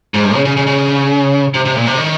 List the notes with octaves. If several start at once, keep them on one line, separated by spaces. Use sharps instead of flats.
G#2
G2
C#3
C#3
C#3
C#3
C3
C3
A#2
C3
D#3